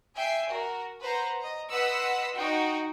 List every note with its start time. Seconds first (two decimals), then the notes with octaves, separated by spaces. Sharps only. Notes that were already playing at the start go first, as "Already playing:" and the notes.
0.17 E5 G5 G#5 C7
0.50 F#4 A#4
1.02 B4 C5 F#5 A#5
1.40 D#5 A#5
1.71 B4 D#5 F#5 C6 E6 B6
2.35 D#4 F#4 G5